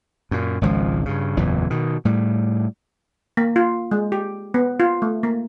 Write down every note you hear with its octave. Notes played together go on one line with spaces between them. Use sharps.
F#2 A#2
G#1 C#2 B2 F3
G2 C#3
F#1 E2 A#2 E3
B2 D#3
A2 G3
A#3
F4
G#3
G4
B3
F4
A3
A#3